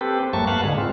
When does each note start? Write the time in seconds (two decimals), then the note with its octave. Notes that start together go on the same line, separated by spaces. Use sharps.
0.01 C4 G4 A4 B4
0.20 C4
0.33 G2 F#3 A3 A#3 A5 C#6
0.47 B4 F5 F#5 A5
0.63 G#2 D3 G#3 F#4
0.78 C4 F4